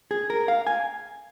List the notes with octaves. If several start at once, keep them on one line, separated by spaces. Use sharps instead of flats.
G#4
A#4
F5
G#5